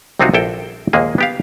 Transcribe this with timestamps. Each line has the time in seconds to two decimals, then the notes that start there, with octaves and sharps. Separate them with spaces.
0.19 C2 C3 C4 D#4 F4 F#4
0.34 A#1 E4 A4 G5
0.93 A#1 D#2 G#3 A#3 G#4
1.18 B3 G4 F5